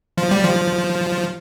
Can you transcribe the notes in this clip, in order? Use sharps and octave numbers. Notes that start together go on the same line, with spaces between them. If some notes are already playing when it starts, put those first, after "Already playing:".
F3
G3
F3